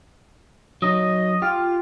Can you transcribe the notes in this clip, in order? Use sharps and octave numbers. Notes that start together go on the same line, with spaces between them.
F#3 D#4 D#5
F4 G4